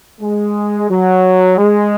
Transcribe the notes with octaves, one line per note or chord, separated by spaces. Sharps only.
G#3
F#3
G#3